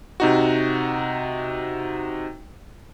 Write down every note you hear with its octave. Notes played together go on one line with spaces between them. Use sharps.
C3 D#4 F#4